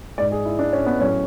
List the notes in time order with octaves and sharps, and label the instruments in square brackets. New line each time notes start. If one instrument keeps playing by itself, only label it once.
[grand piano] G#2 G#3 D5
G#4
E4
D4
C#4
B3
A2 F#3 A3 C#4